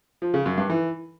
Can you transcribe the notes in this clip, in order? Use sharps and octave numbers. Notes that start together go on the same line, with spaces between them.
F3
C#3
F#2
G2
E3